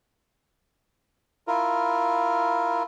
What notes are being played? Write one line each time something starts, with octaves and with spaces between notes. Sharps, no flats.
E4 F4 A#4